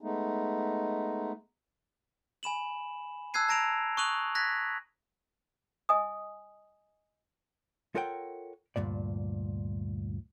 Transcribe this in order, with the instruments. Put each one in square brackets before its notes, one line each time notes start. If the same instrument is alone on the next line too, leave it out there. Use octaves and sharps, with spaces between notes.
[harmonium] G#3 A3 B3 D#4
[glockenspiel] G#5 B5 E7 F#7
A5 E6 F#6 G#6 C7 D#7
A5 A#5 A#6 D7 E7 F7
C#6 D#6 F#6 D#7 F7 F#7
F#6 G#6 A#6 B6
[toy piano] D#5 G#5 D#6
[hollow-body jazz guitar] F4 A4 A#4 C#5 F#5 G5
D2 G2 A#2 D5